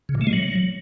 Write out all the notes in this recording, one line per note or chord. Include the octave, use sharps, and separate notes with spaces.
C#3
A#2
A3
G#3
F#3